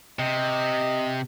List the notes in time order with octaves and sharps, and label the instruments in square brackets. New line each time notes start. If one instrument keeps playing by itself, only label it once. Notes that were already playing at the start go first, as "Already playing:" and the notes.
[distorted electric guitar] C3 [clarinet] D#5